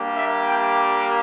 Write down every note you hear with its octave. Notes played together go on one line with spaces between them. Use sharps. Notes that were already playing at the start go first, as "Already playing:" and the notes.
Already playing: G3 A#3 D4 G4
E5
G5